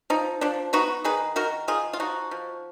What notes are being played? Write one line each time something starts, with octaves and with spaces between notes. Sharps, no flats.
F3 D#4
F3 D4
B3 D#4 F#4
D#3 G#4 B4
D#3 F#4 A#4
D#3 F4 G#4
F4
F3 D#4 F#4
F3